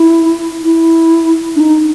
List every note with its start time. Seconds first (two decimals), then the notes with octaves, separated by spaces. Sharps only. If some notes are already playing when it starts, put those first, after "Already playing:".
Already playing: E4
0.63 E4
1.56 D4
1.60 D#4